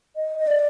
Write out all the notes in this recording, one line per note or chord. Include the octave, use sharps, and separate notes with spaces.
D#5
D#5
D5